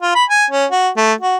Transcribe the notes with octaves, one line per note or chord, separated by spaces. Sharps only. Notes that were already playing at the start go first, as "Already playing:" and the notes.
F4
B5
G#5
C#4
F#4
A3
F#4